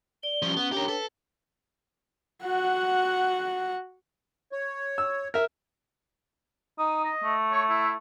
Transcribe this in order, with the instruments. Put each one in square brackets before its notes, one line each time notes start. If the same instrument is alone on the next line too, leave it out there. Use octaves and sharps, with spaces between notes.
[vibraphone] D5 [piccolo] G7
[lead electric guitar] F3 G3 [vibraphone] C#4
[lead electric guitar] B3
[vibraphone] D4 C#5 G5 [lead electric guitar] G4 A#4
[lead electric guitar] A4 [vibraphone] B4 A5
[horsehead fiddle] F#4 F#5
[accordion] C#5
[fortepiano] E6
A#4 E5
[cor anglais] D#4 [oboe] D#6
[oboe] D#5
[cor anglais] A3
[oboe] C#5
E4